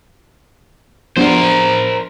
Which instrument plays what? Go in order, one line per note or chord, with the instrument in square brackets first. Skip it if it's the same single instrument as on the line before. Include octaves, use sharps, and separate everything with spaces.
[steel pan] F3 B3 D4 [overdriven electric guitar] A#4 C5